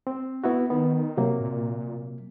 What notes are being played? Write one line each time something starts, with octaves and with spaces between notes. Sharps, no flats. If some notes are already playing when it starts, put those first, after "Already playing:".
C4
B3 E4 F#4
D#3 B3
C3 F#3 A#3
A#2